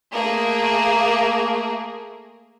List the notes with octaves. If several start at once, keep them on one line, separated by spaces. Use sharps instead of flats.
A3 A#3 G#4 A#4